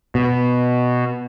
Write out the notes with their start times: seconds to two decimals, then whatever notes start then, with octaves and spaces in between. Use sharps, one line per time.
0.15 B2